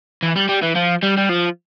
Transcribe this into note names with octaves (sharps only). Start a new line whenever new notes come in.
E3
G3
G3
E3
F3
G3
G3
F3